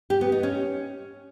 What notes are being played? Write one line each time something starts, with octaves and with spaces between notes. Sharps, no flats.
G4
B3
D#4
C#4